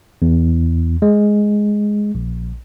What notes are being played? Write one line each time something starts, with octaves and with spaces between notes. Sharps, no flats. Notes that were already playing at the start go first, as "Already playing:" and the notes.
E2
G#3
A#1